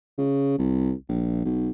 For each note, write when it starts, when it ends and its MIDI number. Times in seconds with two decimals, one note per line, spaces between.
0.18 0.54 49
0.58 0.92 36
1.09 1.42 34
1.45 1.70 35